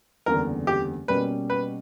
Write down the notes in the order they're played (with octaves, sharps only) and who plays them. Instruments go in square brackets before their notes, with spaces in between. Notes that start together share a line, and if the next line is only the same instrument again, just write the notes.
[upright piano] F#1 E2 D3 G3 [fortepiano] A#4
[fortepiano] G4
[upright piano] B2 G3 A#3 C#4 [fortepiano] B4
[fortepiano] B4